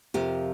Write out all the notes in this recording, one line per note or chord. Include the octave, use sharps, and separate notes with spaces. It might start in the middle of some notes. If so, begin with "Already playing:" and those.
F2 C3 F3 G4 A#4